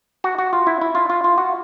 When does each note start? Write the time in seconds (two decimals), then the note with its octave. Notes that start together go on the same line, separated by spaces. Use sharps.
0.24 F#4
0.38 F#4
0.53 F4
0.67 E4
0.81 E4
0.95 F4
1.10 F4
1.24 F4
1.38 F#4